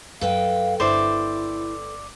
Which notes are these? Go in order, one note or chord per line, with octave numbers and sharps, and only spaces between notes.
F#2 A4 B4 F5 G5
G1 E4 C5 D5 E5